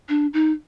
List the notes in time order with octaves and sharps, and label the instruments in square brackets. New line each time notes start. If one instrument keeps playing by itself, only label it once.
[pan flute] D4
D#4